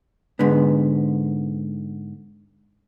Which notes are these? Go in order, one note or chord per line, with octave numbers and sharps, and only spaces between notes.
G#2 D3 B3